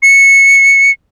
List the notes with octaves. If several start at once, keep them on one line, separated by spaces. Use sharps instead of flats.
C#7